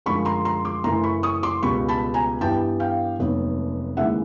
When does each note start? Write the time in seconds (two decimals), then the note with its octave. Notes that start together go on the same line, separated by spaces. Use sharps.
0.06 F#2 D3 F3 G#3 B5 C#6
0.25 A#5 C6
0.45 A#5 C6
0.65 C6 D6
0.84 F#2 C#3 E3 A3 A#5 C6
1.03 B5 C#6
1.23 C#6 D#6
1.43 C6 D6
1.63 C#2 B2 G3 B5 C#6
1.88 A5 B5
2.14 G#5 A#5
2.41 G2 E3 G3 B3 G5 A5
2.80 F5 G5
3.19 F1 D#2 D#3 F#3 B3
3.97 D#2 C#3 E3 G#3 E5 F#5